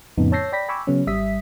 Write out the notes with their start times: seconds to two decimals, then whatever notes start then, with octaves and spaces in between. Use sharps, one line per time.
0.17 F2 A2 C#3 B3 D#4
0.32 C#5 A5 E6 G6 A#6 C7
0.52 D5 G5 B5 A#6 B6
0.68 G5 G#5 B5 C#6 D6 E6
0.87 C#3 F#3 B3 C#4
1.07 G#1 G3 E5 D#6 B6